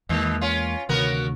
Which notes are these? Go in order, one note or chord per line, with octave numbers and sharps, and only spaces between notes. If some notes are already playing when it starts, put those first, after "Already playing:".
E2 B2 D#3 G#3 A#3
C#4 F4
D2 C3 D#3 B3 F#4 A#4